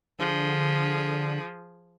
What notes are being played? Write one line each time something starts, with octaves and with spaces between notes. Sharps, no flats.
D3 F3 G#4